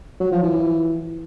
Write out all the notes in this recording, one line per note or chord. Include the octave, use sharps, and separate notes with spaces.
F#3
F3
E3